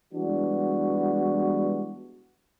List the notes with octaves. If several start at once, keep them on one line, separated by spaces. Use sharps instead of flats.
E3 G3 G#3 B3 D4 F#4